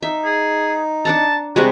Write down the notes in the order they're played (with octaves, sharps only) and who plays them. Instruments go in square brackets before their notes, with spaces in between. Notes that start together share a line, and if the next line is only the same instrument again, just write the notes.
[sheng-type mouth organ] D#4 [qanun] E5
[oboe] G#4
[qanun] D4 F#5 A#5 [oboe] A5
[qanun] C3 G3 G#3 [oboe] F#4